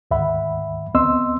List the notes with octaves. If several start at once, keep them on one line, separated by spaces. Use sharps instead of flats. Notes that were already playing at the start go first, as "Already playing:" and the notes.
D2 G#2 D#3 E5 F#5 B5
D2 B3 C4 D#5 C6 E6